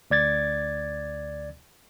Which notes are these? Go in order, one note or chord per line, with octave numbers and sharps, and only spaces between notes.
D2 D5 G#6 A6